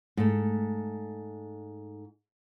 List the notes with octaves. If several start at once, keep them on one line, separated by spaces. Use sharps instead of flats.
G#2 A3